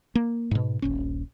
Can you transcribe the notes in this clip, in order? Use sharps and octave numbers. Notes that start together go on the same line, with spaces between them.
A#3
G#2 B2
D#1 A#1 C#4